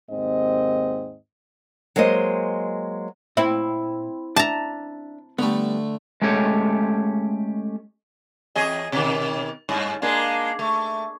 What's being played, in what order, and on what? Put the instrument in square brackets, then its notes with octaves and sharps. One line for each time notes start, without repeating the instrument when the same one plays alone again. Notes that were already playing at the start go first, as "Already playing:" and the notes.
[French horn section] D#2 G#2 C4 D#5
[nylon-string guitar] F#3 G#3 A#3 C5 D#5
[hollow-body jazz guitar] A#2 [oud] C4 E4
[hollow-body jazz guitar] D4 E5 [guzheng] A5 A#5
[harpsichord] D3 A3 [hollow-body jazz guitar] G3 B3
[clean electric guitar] G#3 A3 C#4 G4 C#5
[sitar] E2 G#4 D#5
B2 D#3
G2
G#3 A#3 D4
A3